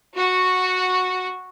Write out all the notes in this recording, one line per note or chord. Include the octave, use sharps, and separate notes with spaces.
F#4